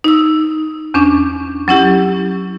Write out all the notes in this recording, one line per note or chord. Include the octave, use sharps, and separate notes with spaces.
D#4 E6
E2 C#4 D4
F#3 C#4 E4 G4